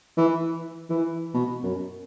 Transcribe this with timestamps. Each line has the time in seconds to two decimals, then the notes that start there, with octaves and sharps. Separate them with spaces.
0.17 E3
0.90 E3
1.34 B2
1.63 F#2